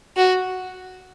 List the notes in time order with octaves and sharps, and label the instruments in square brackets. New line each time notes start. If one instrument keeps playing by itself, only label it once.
[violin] F#4